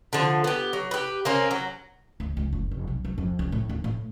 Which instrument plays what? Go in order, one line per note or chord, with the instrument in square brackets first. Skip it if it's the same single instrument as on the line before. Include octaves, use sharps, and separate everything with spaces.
[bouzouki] D3 F3
B3 G4
F#3
G4 B4
A#3 C4 C#4
F#3
[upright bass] D2
C#2
F#1
F1
B1
F#3
F2
C#2
A2
D#2
A2